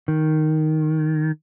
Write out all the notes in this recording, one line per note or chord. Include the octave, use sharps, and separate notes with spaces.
D#3